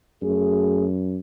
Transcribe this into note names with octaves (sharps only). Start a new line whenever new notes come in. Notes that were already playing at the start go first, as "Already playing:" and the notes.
F#2 A3 F#4 G#4